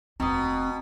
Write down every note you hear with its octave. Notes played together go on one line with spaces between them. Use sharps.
F1 D#2 B2 C4 A#5 D#6